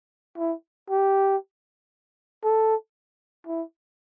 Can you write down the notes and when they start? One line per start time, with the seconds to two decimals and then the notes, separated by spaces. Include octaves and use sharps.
0.38 E4
0.90 G4
2.44 A4
3.47 E4